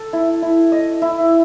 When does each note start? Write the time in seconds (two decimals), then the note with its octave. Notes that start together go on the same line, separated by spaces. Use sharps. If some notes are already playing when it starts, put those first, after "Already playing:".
Already playing: A4
0.13 E4
0.42 E4
0.72 D#5
1.02 E4